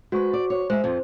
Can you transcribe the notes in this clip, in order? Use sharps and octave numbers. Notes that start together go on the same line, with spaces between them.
G#3 F#4 B4 C5 C#6
D5
C#5
G#3 C5 E5
F2 F3